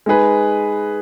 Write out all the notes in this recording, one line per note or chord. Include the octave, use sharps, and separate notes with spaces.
G#3 D#4 G#4 B4